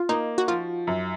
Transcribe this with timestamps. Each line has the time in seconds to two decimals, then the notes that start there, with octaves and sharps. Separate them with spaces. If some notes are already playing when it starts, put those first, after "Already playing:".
Already playing: F4
0.09 A#3 D#4
0.38 F#4
0.48 F3 F4
0.87 F#2